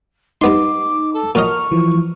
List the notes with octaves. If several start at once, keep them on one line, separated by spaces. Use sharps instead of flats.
G2 B3 D#4 C6 D6
A4
A#2 F#3 A#4 D#5 C#6 F6
E3 F3